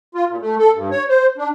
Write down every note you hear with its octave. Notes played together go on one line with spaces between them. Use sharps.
F4
A#2
A3
A4
G2
C#5
C5
D4